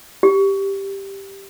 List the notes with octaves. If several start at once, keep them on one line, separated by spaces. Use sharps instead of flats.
G4